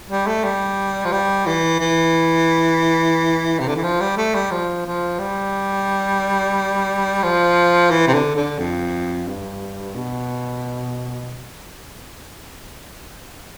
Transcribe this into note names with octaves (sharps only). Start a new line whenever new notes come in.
G3
A3
G3
F3
G3
E3
E3
C3
D3
E3
F3
G3
A3
G3
F3
F3
G3
F3
E3
C3
D3
D3
F2
G2
B2